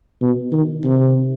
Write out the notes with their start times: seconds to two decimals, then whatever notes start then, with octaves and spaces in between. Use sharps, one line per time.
0.21 B2
0.52 D#3
0.84 C3